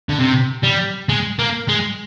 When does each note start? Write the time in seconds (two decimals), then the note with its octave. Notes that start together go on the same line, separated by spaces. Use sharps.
0.09 D3
0.20 C3
0.64 G3
1.09 G#3
1.39 A#3
1.68 G#3